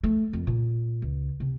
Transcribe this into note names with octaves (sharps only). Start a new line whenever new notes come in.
A3
F2
A#2
C#2
C3